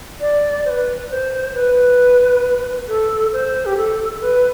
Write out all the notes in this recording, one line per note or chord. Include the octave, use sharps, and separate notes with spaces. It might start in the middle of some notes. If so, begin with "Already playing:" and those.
D5
C5
B4
C5
B4
A4
C5
G4
A4
B4